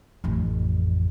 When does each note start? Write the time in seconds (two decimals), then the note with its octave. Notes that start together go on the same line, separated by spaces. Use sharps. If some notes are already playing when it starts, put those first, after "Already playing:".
0.24 A1 F2